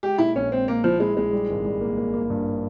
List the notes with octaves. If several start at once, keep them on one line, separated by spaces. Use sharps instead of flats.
G#3 G4
A#2 E4
A#1 C#4
G#3 C4
A#2 A#3
F3 E4
G#3 E4
A#1 G#3
G3
G#1
G3
A#3
A#3
A#3
G2